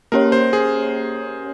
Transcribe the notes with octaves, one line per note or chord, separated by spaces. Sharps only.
A#3 C#4 G4 A#4 C#5
C5
G#4